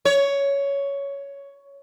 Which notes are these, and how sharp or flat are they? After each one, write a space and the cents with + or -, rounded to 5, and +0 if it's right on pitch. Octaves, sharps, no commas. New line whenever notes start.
C#5 +10